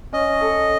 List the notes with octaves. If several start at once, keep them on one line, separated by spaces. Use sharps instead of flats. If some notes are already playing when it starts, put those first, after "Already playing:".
C#4 D#5
A4